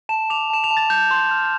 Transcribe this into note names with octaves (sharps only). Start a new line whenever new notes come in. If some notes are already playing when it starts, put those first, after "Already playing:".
A5 E7
D6 F7
A5 E7
F7
A5
A6
G6
C6
F6